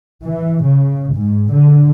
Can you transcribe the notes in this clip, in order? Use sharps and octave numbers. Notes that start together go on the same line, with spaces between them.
E3
C#3
G#2
D3